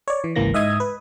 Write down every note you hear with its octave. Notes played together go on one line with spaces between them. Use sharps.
C#5 D5
E3
G#1 C#2 E3 A#3 A#6
G#2 D#5 E5 D#6 G#6
B4